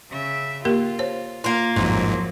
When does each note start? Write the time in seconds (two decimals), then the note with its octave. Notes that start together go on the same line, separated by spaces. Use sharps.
0.11 C#3 E5
0.65 A#3 F4 G4 A#4
0.99 C5 C#5
1.44 A#3 F4
1.76 A1 F2 G#2 F3 F#3 C6